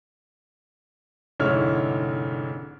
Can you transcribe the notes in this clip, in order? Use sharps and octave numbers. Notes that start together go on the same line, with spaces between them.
F1 G#2 D3 E4 C#5 F6